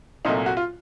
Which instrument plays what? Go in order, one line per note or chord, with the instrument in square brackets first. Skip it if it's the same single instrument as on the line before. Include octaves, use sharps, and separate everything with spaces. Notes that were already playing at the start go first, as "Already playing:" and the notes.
[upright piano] C2 A#2 F#3 A3 D#4
F#4
F4